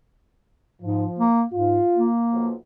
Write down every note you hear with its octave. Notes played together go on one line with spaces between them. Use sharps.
G#2 F3
A#3
G#2 F4
A#3
B1 F3